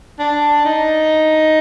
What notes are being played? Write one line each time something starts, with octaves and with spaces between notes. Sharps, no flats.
D4
D#4